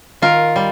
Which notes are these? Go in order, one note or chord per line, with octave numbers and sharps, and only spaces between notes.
D#3 F4 A#4
G3